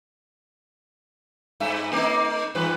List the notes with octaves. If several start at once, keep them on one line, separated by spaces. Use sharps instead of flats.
G2 E5
A3 D#4
G2 E3 B4